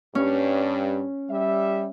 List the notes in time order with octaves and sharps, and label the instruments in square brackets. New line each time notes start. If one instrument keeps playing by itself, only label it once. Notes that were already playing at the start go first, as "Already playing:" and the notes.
[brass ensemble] G2 [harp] C#4
[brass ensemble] G3 E5